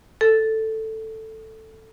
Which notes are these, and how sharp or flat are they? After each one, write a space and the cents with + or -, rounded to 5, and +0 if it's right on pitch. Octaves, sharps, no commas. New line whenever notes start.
A4 +5